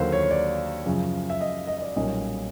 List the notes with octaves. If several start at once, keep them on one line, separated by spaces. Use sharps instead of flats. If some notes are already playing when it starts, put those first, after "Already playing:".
Already playing: D#2 D3 F#3 A#3 C5
C#5
C#5
D5
F#2 C#3 F3
E5
D#5
D#5
D#5
D5
B1 A#2 G3 A#3 C#4 D#5